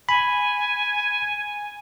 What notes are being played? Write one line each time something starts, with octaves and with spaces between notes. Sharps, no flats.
G#5 B5